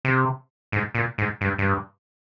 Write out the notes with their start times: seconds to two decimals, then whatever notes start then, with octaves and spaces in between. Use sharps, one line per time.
0.05 C3
0.72 G#2
0.95 A#2
1.18 G#2
1.41 G2
1.58 G2